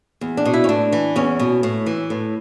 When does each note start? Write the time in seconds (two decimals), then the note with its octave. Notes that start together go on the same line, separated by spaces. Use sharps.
0.21 E2
0.37 D4
0.45 B2
0.54 E4
0.64 C#4
0.69 A2 D4
0.92 E3
1.16 E2 C#4
1.39 B2
1.63 A2
1.86 E3
2.10 A2